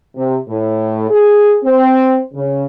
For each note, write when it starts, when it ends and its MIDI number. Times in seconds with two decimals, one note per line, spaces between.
0.16 0.36 48
0.48 1.05 45
1.10 1.58 68
1.64 2.20 60
2.34 2.65 49